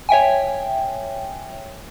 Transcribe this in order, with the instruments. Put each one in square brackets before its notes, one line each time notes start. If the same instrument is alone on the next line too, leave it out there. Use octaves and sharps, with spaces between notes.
[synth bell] C#5 E5 G5 G#5